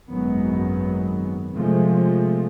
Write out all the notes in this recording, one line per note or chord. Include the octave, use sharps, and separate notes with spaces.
G#1 F#2 D#3 F#3 G#3 B3
C3 F3 G#3 A3